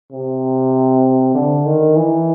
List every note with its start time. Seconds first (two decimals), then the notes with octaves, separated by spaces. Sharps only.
0.12 C3
1.35 D3
1.66 D#3
1.96 E3